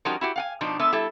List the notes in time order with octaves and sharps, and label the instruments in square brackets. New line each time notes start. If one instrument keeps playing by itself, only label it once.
[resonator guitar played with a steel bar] F3 G3 C#4 D#4 F#4 A#4
E4 F#4 G4
F5 F#5 G#5
B2 F3 D4 D#4
G#3 B3 A4 B4 E5
G3 E4 A4